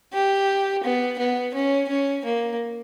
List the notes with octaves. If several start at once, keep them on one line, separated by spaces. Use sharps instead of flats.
G4
B3
B3
C#4
C#4
A#3